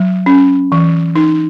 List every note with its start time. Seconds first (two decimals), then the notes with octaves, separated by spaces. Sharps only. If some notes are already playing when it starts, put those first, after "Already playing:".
Already playing: F#3
0.26 C#4
0.72 E3
1.16 D#4